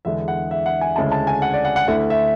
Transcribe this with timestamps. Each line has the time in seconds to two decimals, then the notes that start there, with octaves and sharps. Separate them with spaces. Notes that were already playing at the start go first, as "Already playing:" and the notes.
0.05 E2 D3 G#3 D4 E5
0.28 F#5
0.51 E5
0.66 F#5
0.81 G#5
0.96 D2 C#3 G#3 C#4 E4 A5
1.12 A5
1.27 G#5
1.42 F#5
1.54 D5
1.65 F#5
1.76 F#5
1.88 D2 D3 A3 E4 F#5
2.10 E5